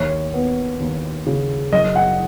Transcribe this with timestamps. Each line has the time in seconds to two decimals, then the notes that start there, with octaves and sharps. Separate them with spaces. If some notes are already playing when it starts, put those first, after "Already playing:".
Already playing: D#2 C#5
0.34 B3
0.80 D#2
1.27 C#3
1.73 F#1 D#5
1.95 F#5